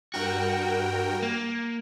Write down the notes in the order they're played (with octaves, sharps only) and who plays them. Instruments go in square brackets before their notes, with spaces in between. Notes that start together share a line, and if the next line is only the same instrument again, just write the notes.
[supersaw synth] G2 A#4 G5 [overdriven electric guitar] F#4
[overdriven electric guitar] A#3